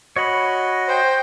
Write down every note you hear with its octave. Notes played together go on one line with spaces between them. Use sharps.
F#4 C#5 D#5 B5
C5 G5